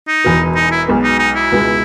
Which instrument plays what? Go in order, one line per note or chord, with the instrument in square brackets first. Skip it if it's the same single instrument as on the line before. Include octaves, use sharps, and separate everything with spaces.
[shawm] D#4
[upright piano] E1 E2 B2
[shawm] D#4
E4
[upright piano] B1 B2 G#3 B3
[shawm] D#4
D#4
E4
[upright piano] C#2 B2 G#3